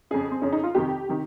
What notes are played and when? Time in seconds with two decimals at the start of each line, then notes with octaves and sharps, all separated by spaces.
0.11 F2 C#3 G#4
0.31 C4
0.42 F2 C#3 C#4
0.53 D#4
0.63 F4
0.75 F2 C3 D#3 G4
1.09 C3 D#3